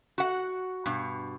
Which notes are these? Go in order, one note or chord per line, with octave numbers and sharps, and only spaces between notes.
F#4 F#5
G2 B2